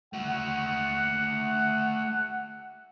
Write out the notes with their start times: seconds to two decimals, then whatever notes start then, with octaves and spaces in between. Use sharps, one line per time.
0.13 A3 F#4 F#5